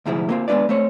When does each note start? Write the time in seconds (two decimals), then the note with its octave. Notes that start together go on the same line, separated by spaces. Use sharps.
0.06 D2 G#2 C3 F3 E4 G#4
0.29 A#3 C4 F4
0.48 G#3 B3 D4 B4 D5
0.69 A3 C4 C#5